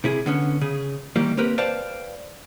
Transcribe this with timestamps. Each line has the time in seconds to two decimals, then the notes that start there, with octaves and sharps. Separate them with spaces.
0.04 C3 E4 G#4
0.26 D3 B3 C#4
0.61 C#3 G#4
1.16 D#3 E3 G3 A#3
1.37 A#3 C4 G4 A#4 B4
1.58 B4 C5 D5 F5 G5 A5